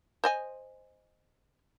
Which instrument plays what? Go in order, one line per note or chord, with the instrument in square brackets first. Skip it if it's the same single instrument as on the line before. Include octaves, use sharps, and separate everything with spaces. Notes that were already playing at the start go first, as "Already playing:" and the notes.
[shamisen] C5 D#5 G#5